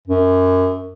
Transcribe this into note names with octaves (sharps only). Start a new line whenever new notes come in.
F#2